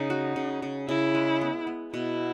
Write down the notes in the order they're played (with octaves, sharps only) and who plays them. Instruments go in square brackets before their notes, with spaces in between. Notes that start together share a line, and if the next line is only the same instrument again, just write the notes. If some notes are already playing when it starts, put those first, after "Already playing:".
Already playing: [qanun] C#3 [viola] D#4
[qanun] F#4
C#3
C#3
[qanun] C#3 [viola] E4
[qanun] G#3
B3
B3
[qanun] B2 [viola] E4